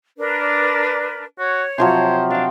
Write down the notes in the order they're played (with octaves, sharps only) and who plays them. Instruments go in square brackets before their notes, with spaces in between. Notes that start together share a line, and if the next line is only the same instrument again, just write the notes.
[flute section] D4 A#4 B4
[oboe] D5
[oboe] F#4 [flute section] C#5
[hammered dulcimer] C3 F3 F#3 [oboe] C5
[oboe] D4 [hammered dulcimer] F5 G5